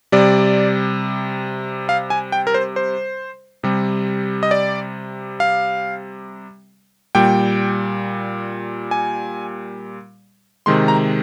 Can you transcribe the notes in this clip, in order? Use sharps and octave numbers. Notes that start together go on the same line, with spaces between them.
C3 G3 D5
F5
G#5
G5
A#4
C5
C5
C3 G3
D#5
D5
F5
A#2 G3 G5
G#5
C3 D#3 G#3 C6
A#5